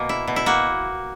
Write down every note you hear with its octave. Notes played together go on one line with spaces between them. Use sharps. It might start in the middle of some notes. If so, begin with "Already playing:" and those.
Already playing: B2 A#3
E4
B2
E4
A#3 F#4